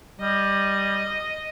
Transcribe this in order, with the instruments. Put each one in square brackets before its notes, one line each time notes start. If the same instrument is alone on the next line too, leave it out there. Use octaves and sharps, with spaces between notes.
[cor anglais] G3 [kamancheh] D#5